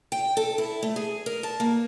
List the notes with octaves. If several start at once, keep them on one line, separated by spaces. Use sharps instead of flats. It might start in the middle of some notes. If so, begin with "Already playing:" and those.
G5
A4
E4
A3
G#4
A#4
A5
A#3